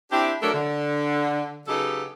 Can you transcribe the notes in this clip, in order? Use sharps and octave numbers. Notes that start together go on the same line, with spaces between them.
C4 D4 E4 G4
F#3 A3 D4 A4 A#4
D3
C#3 F#3 B3 D#4 G4 A4